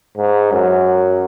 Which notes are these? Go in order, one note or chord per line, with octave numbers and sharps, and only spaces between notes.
G#2
F#2